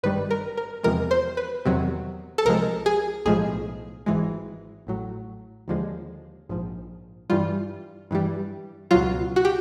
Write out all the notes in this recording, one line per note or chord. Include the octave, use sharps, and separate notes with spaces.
G#1 G2 D#3 G3 B4
A#4
A#4
E2 C3 F3 G#3 A#4
C5
B4
E2 C3 D#3 F#3
A4
C2 C3 F3 G#3 A#4
G#4
B1 A2 F3 G#3 G#4
G#1 G#2 E3 G#3
A1 A2 F#3
D#2 D3 F3 G#3
A#1 G#2 F3
G2 E3 G3 F4
G2 E3 G3
C#2 B2 F#3 F4
F#4
G4